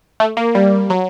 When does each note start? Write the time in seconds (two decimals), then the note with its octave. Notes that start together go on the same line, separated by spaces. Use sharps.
0.20 A3
0.37 A#3
0.55 G3
0.90 F#3